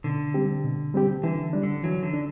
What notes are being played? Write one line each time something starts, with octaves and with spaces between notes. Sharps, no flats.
B2 D3
G3 C4 G4
B2
G3 C4 G4
D3 E3
G3 D4
D3
E3 F#3
D3
D4